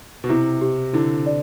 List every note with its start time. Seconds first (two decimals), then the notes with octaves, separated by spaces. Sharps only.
0.24 B2
0.29 C3 E4
0.61 G4
0.93 D3 E4
1.27 D5